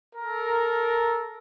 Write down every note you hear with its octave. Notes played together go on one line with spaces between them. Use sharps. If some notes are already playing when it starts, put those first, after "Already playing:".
A4 A#4